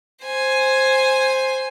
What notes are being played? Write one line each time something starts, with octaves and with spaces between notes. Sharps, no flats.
C5 G#5